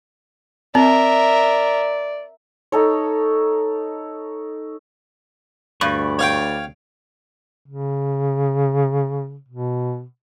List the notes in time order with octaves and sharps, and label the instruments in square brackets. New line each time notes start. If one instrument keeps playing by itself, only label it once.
[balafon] C4 [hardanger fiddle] A#4 E5 [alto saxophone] D5
[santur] D#4 A4 C#5
[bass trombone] D2 [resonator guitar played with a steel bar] G2 [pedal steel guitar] D5 B5 C#6
[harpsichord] C#5 F5 G5
[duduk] C#3
B2